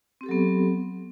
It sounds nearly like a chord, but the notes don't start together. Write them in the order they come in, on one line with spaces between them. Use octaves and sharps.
C4 G4 A4 F#3 B3